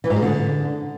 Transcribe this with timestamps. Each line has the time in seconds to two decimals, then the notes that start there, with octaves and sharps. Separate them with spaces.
0.04 E3
0.10 G#2
0.16 G#3
0.22 D3